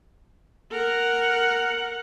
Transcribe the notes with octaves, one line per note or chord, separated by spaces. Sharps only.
A#4 F#5